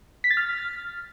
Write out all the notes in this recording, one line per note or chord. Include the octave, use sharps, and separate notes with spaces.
B6
A6
F6